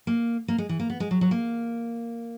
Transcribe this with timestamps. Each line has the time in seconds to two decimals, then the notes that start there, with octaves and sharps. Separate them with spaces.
0.07 A#3
0.48 A#3
0.58 G#3
0.69 E3
0.80 A#3
0.90 B3
1.00 G#3
1.11 F#3
1.21 F#3
1.31 A#3